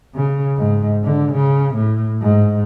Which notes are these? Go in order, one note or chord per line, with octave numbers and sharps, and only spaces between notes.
C#3
G#2
D3
C#3
A2
G#2